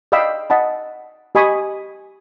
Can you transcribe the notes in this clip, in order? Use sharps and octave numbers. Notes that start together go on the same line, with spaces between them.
D5 D#5 F5 G5 B5 E6
D#5 F#5 A5 B5
G4 D#5 G#5 B5 C#6 D#6